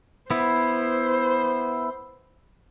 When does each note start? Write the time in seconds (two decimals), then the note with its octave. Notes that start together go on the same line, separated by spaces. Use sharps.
0.31 B3 E4 C5